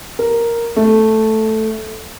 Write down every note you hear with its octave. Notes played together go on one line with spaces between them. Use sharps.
A#4
A3